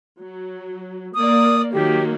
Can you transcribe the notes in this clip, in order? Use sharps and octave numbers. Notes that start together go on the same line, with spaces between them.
F#3
A#3 D5 D#6
D#3 F#3 A#3 G4